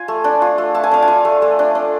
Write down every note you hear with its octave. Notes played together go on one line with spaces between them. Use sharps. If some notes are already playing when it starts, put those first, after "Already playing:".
Already playing: F4 G#5
A3
D4
F4
A3
A3 A5
G#5
D4 F5
G#5
F4
A3
A3
D4
D4